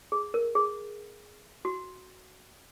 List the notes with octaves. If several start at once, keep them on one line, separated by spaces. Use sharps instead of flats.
G#4
A#4
G#4
F#4